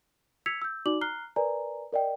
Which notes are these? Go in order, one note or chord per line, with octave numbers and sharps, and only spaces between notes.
E6 G#6 B6 C#7 F7
E6 G6
D#4 F#4 D5 D6 F#7
A#5 F6 F#6 C7 G7
A#4 B4 D5 G#5 A#5
A#4 D5 D#5 G5